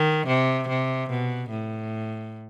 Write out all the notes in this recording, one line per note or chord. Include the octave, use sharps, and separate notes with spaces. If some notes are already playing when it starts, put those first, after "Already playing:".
Already playing: D#3
C3
C3
B2
A2